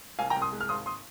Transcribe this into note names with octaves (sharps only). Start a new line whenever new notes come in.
C2 F5 G#5
G5 A#5
C2
C6 D#6
G#3
F6
G#1 C6 D#6
C6 D#6